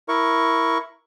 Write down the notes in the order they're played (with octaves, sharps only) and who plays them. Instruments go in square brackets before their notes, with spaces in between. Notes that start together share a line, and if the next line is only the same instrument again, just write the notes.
[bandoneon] E4 A#4 C#6